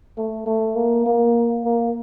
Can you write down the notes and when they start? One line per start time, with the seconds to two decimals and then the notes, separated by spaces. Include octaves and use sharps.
0.18 A3
0.46 A3
0.76 A#3
1.06 A#3
1.65 A#3